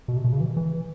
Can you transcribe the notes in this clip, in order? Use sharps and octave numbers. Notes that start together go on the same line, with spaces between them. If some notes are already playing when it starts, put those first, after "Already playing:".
B2
C3
B2
C#3
E3
E3